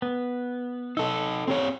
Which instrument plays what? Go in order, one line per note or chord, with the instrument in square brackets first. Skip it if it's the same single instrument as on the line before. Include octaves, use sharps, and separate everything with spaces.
[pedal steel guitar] B3
[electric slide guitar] D#4 A4 [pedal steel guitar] E6
[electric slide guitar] C4 G4 C#5